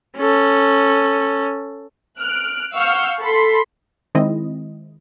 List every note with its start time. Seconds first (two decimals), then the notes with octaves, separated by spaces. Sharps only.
0.18 C#4 A4
2.19 F6 F#6 D7
2.74 F5 F#5 C#6 E6 F6 G6
3.20 A4 B5 C6
4.15 D#3 G#3 C4 E4 D#5